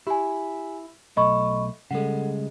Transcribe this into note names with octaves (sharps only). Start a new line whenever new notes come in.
E4 G4 G#5
B1 A3 D#5 B5 C#6
C#3 G3 G#3 A4 F#5